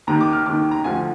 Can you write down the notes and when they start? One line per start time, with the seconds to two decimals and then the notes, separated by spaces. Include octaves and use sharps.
0.07 D#2 D#3 A#5
0.21 D6
0.33 F6
0.46 D#2 D#3 D6
0.71 A#5
0.84 D2 D3 F3 G#5